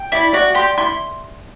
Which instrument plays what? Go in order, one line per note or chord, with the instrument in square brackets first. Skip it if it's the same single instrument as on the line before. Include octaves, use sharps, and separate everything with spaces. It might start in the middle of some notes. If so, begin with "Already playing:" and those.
Already playing: [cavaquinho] G5
[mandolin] E4 [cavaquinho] D5
[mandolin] F#4 [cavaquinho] D5
[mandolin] G4 [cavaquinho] C6
[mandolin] E4 [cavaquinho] C6